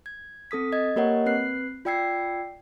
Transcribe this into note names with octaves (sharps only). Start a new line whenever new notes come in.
G#6
C4 A4 D#6 B6
D#5 G#6
A#3 G4 A#4 C#5 D#5 F#5
C4 B4 F#6 C7
F4 D5 G5 E6 G#6 C7